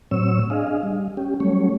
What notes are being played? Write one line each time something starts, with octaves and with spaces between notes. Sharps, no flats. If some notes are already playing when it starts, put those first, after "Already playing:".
A2 F#3 C4 C#5 E6
D4 G#4 D#5 F5
G3
C#4 G4
F#3 G3 A3 C#4 C#5